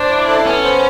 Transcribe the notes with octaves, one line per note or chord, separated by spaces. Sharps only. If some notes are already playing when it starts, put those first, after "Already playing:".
Already playing: D4 C5
E4
A4
B3 C#4
C5